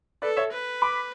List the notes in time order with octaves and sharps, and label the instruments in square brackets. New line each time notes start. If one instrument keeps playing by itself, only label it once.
[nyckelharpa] A4 [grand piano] B4 D5
[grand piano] C#5 E5
[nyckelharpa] B4
[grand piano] B5 D6